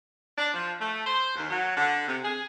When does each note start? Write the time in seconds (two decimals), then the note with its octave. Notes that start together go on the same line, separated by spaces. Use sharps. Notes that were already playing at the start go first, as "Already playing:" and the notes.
0.37 D4
0.54 F3
0.80 A3
1.06 C5
1.35 D#2
1.50 F#3
1.77 D3
2.08 C3
2.23 G#4